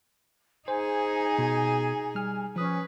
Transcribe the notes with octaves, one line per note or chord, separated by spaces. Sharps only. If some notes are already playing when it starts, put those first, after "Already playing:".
D#4 G#4 C5 G#5
B2
G3 F6
F3 C#4 B4 D#6